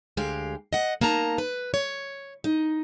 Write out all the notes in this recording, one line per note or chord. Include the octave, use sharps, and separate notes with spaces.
D2 G#3 G4 F5
D#5 F#5
A#3 D#4 A5 A#5
B4
C#5
D#4